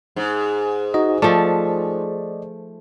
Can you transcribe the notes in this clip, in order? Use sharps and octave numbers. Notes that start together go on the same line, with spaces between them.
G#2
D#4 F#4 D#5
F3 A3 D5 D#5